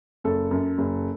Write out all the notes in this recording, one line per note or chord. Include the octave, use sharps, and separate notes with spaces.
F#1 A4
F#2
F#1